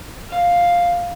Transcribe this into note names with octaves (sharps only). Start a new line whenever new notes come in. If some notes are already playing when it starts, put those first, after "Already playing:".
F5